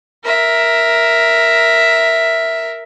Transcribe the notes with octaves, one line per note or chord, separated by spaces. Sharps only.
A#4 E5